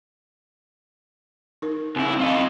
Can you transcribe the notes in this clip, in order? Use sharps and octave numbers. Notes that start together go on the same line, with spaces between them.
D#4 A#4
C#2 C4 E4
F4 D#5